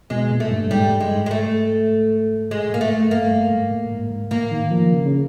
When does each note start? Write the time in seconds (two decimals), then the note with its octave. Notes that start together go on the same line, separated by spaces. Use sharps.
0.10 B2 G#3
0.31 A#2
0.40 A3
0.51 G2
0.71 G#2 G3
0.90 G2
1.00 G#3
1.11 G#2
1.26 G#3
1.31 A3
2.50 A2 G#3
2.70 G#2 A#3
2.81 A3
2.91 G2
3.11 G2 A#3
3.31 G2
3.51 G#2
3.71 A2
3.91 G#2
4.11 G#2
4.31 A2 A#3
4.51 D#3
4.71 F3
4.92 C#3
5.06 C#3